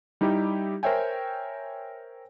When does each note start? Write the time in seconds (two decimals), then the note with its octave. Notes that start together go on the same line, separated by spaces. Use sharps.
0.21 G3 D#4 E4 G4
0.83 A#4 C5 C#5 E5 G5 G#5